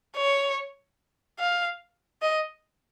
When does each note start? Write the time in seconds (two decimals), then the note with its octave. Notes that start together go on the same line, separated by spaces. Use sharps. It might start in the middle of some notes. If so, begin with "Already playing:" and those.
0.16 C#5
1.40 F5
2.22 D#5